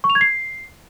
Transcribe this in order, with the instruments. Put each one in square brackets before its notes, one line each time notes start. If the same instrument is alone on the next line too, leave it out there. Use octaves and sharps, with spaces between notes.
[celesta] C#6
F7
G#6
C7